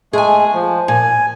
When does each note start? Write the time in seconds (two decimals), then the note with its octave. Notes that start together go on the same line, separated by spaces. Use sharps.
0.13 G#3 A3 G#4 G#5
0.54 F3
0.88 A#2 G#5